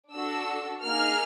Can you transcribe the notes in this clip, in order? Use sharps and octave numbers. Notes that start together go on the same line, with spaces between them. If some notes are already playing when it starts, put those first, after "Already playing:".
D4 F#4 A4 E6
A#3 D#4 G#4 F6